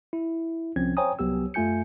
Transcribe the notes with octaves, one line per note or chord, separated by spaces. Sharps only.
E4
C2 F3 C4 C#4 G#6
C5 C#5 G5 G#5 A#5 D#6
C2 F#3 B3 G4 E6
F#2 A3 F4 G#5 G6 C#7